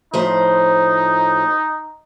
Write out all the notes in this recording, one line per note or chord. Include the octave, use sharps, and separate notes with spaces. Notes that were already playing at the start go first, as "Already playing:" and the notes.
A2 F3 D#4 C5